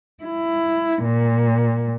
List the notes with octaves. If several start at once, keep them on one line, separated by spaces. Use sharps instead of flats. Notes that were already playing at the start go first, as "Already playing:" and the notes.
E4
A#2